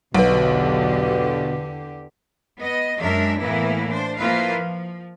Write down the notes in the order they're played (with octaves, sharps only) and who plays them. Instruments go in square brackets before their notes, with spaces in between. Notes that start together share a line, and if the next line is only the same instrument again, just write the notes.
[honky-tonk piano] B1 [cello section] E2 D3 G4 [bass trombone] B2 [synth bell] B4 F#5
[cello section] B3 D#5
F#2 G#3 D4 A#4 E5
A2 E3 A#3 B3 E4
D4 C5
F3 A#3 E4 F4 B4 F5
F3